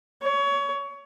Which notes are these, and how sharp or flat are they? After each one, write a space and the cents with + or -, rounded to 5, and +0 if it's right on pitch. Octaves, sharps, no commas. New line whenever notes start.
C#5 +25